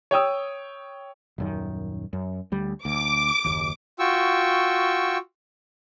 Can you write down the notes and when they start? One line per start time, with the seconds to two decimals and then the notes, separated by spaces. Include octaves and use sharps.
0.11 C#5 G5 D#6 E6
1.38 D#1 F#2 D#3
2.13 F#2
2.52 D2 G3
2.85 D2 D6
3.44 F#1 D#2
3.99 F4 F#4 G5 C#6 E6